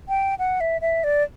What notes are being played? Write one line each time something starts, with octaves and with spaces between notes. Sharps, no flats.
G5
F#5
E5
E5
D5